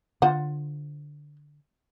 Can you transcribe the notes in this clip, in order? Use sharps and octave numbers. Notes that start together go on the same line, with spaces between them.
D3 F4 C5 F#5